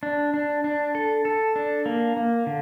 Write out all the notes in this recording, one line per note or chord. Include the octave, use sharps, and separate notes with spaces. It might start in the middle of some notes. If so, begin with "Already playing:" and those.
D4
D4
D4
A4
A4
D4
A#3
A#3
D3